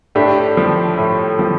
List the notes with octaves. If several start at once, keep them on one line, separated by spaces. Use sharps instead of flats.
A2 D4 G4
F3
A2
F3